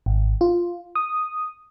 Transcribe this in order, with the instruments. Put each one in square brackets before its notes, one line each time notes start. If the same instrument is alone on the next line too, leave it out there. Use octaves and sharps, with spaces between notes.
[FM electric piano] G#1
F4
D#6